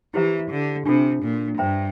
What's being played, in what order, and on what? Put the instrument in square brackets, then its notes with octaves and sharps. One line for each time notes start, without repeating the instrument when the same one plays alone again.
[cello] E3 [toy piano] E4 G4 C5 E5 A#5
[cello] D3
[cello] C3 [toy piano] D4 F4 A4
[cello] A#2
[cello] G2 [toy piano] C5 E5 G5 A#5